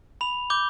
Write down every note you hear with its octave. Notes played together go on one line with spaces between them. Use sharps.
B5 F7
D6 G6 G7